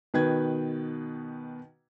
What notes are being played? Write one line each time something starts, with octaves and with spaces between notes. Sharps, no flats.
B2 D#3 B4 G5 G#6